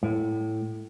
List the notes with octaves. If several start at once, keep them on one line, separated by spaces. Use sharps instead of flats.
A2